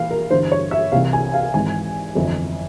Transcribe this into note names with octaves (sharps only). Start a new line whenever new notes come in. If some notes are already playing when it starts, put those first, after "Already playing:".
Already playing: A#1 E3 F5
A#4
G1 G2 E3 C5
C#5
E5
C2 C3 E3 F5
G#5
F5
G#1 G#2 E3 G#5
G1 F2 E3